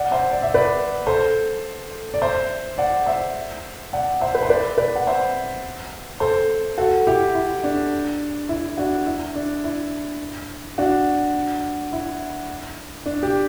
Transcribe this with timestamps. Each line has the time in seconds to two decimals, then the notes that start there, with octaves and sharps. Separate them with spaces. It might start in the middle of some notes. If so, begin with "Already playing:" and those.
Already playing: D5 F#5
0.11 C5 E5
0.31 D5
0.42 E5
0.54 B4 D5
1.07 A4 C5
2.14 D5
2.21 C5 E5
2.78 D5 F#5
3.06 C5 E5
3.93 D5 F#5
4.21 C5 E5
4.35 B4
4.43 C5
4.49 B4 D5
4.78 B4 D5
4.96 F#5
5.07 C5 E5
6.20 A4 C5
6.78 F#4 A4
7.07 E4 G4
7.35 E4
7.64 D4
8.49 E4
8.77 D4 F#4
9.06 E4
9.35 D4
9.64 E4
10.78 D4 F#4
11.93 E4
13.06 D4
13.23 G4